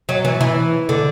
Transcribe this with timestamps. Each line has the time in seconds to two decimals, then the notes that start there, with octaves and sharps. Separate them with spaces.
0.09 F#3
0.25 E3
0.41 E3
0.89 D3